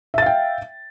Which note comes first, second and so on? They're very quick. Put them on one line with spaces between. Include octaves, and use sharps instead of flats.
E5 A6 F5 G5